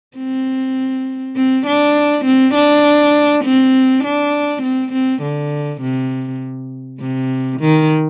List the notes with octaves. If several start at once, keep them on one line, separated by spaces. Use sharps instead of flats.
C4
C4
D4
C4
D4
C4
D4
C4
C4
D3
C3
C3
D#3